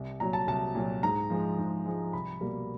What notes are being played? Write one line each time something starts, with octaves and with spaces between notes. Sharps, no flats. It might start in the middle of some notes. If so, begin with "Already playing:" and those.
Already playing: C2
A#2 F#3 A#5
A5
C2 A5
A#2 F#3
G#2 A#5
F3 G#3
G#2
F3 G#3
C2 B5
B2 G3 A#3